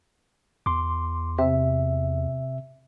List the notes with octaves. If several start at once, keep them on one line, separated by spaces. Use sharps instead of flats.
E2 C6 D6
C3 E5